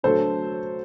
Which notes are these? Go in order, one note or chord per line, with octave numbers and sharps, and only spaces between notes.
D3 F#3 A3 A4 C5